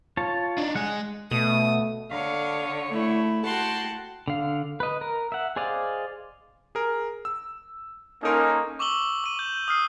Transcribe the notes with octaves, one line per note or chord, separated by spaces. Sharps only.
F4 C#5 A5
D4 D#4
G#3 G#4 F#5
B2 A3 D#6
D3 C#5 F5
A3 E4
F#4 F#5 G5 A5 C6
D3 F5
B4 D#5
A#4
E5 F#5
G#4 C5 D5 D#5 F5
G#4 A#4
E6
A#3 C#4 D#4 A4 A#4 C6
C#6 D6 E6 F#7 G7
D6 D#7
G6
D#6 F6 C7